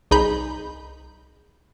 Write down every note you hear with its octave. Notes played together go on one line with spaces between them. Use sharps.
C2 D#4 G#4 B5 G6